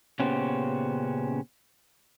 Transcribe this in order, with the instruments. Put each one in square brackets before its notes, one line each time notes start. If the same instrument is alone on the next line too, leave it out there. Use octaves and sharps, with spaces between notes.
[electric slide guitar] A#2 C#3 B3 C#4 G4 C5